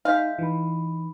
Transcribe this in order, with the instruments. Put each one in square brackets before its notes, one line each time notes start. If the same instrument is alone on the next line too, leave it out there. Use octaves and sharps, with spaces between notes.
[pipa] G#3 F5 [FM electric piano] D#4 [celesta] E5 G6 B6
[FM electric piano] E3 [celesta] D#4 B5